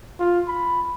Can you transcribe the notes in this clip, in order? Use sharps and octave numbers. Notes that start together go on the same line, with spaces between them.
F4
B5